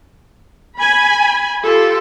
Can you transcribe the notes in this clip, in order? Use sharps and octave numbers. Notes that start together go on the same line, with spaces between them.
G#5 B5
F4 G4 A4